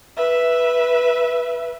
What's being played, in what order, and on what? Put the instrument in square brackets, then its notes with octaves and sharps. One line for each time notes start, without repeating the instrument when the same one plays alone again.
[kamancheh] B4 E5